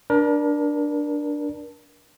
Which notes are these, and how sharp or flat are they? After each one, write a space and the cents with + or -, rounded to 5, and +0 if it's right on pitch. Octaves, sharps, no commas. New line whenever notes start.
D4 +0 A#4 +35